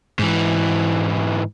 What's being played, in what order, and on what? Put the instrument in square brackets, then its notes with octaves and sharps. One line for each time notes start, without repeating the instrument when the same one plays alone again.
[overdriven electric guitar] G#2 E3